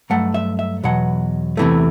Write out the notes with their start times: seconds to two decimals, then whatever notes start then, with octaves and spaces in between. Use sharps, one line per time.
0.10 G2 F#3 A3 F#5
0.34 E5
0.59 E5
0.84 E2 B2 F#3 F#5
1.57 E2 C3 E3 A3